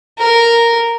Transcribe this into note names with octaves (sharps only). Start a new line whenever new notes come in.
A#4